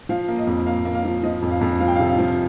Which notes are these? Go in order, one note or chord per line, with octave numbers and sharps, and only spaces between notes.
F3 F5
A#3
D#5
F2
A#3 F5
A#3
F5
F3
F3 D#5
F2
F5
F2
F3 F5
G5
C3 F5
F5
F3